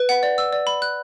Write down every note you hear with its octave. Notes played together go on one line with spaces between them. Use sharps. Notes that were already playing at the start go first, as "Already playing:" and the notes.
Already playing: B4
F#5
D5
E6
D5
B5
F#6